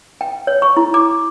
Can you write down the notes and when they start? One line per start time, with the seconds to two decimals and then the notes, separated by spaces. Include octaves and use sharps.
0.21 G5
0.47 C#5
0.62 C#6
0.77 E4
0.94 D6